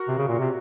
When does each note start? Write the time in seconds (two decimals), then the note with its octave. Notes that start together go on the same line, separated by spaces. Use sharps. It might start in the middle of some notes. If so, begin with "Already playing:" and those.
Already playing: F#4 A#4
0.08 C3
0.18 C#3
0.28 A#2
0.39 C3